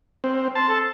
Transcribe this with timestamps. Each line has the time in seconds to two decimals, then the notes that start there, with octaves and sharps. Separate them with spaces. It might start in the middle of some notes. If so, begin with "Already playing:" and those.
0.24 C4
0.55 A5 C6
0.69 A4